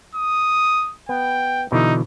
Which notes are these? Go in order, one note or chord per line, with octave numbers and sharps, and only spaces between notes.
D#6
B3 G5
B2 D3 E3 D#4